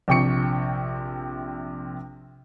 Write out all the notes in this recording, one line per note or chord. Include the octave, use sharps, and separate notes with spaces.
A#1 C3 G5 C#6 C#7